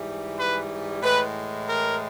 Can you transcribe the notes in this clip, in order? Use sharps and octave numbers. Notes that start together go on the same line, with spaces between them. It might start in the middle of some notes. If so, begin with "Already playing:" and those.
Already playing: G#2 E3 G3
B4
A2 E3 G#3 B4
A#4